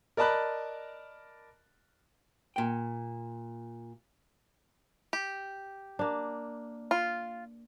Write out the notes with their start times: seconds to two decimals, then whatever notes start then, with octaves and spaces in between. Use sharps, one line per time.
0.17 A#4 D5 D#5 A5 B5 F#6
2.56 A#2 G5
5.13 G4
5.99 A#3 D4
6.91 F4